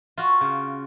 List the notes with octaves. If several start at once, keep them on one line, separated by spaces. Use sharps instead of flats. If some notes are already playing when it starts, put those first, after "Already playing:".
F4 F#4
C#3